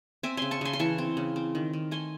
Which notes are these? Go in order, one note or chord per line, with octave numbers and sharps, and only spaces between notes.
C4 E5 G#5
C#3 G#5 C6
A5 C#6
C#3 G#5 C6
C6
E3 A5 C#6
C4
C#3
C4
D#3
D#3
A3 G#5 C6